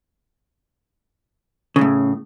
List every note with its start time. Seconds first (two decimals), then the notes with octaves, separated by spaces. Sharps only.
1.76 C#3
1.79 F#2
1.81 A2